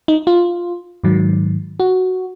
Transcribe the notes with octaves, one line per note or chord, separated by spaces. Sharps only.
D#4
F4
G#2 D#3 F#3
F#4